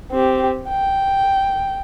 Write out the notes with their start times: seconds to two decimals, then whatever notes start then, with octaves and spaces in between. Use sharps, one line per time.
0.12 C4 G4
0.69 G5